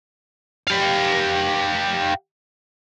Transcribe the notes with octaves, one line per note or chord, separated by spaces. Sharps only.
G4 F5